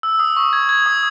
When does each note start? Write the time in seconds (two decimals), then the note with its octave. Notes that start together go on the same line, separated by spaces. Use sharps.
0.03 E6
0.19 D#6
0.37 C#6
0.53 G#6
0.69 G#6
0.86 D#6